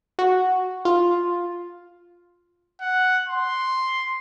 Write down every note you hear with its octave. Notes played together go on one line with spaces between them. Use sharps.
F#4
F4
F#5
C6